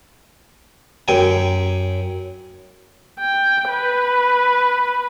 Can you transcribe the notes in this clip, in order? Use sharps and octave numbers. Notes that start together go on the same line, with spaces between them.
F#2 G5 G#5
G5
B4